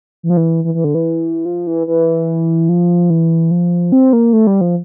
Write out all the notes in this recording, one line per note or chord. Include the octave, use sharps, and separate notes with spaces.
E3
F3
E3
E3
E3
D3
E3
F3
E3
E3
F3
E3
F3
C4
A#3
A3
G3
F3